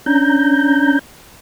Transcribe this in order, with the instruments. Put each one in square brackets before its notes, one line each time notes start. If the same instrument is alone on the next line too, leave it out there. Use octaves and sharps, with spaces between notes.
[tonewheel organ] C#4 D4 A#5 G6